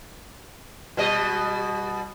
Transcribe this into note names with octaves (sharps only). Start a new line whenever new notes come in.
B2 G3 D#5